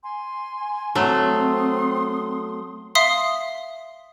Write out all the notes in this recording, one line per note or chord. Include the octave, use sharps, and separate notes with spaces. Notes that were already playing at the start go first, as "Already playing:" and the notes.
G#5 C6
F#3 A3 C4 C6 D#6
E5 F5 C6 D#6 C7